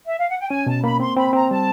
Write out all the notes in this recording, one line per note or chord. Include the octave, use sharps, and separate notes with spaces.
E5
F5
F#5
G5
C#4 G#5
B2 A5
A#3 B5
C4 C6
C4 B5
C4 A#5
G3 A5